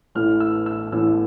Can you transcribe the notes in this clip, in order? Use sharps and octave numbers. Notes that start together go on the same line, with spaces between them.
A1 A2 E3 A3 F6
E6
E6
A1 A2 E3 A3 E6